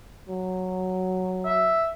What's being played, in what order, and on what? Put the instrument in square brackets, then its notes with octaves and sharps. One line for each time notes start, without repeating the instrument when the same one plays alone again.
[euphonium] F#3
[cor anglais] E5